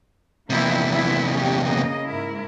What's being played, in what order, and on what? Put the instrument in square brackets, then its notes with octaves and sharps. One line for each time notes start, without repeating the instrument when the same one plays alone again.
[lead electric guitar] E2 C3 [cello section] F3 A#3 E4
[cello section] E4
C#4 G4
C#3 A#3 D#5
G#2 E4 A#4